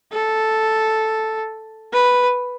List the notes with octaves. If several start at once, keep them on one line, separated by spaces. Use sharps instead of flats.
A4
B4